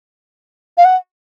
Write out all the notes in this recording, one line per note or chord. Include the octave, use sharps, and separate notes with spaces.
F5
F#5